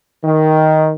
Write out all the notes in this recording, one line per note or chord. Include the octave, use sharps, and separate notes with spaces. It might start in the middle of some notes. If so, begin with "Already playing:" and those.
D#3